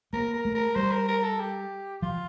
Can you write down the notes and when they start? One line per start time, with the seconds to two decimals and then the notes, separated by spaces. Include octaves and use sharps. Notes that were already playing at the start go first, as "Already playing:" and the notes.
0.13 A#3 A#4
0.34 A#4
0.45 A3
0.55 A#4
0.76 G3 C5
0.91 A#4
1.08 A#4
1.24 A4
1.40 G4
2.02 F3 F4